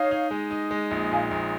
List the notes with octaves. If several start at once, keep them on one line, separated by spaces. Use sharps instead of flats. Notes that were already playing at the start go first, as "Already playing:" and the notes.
Already playing: D#4 C#5 F5
D#4
G#3
D#4
G#3
A#1
A#2 F5 G#5
A#1